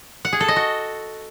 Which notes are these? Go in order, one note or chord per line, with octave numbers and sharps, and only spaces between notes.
F#5
G#4
A4
D#5
F#4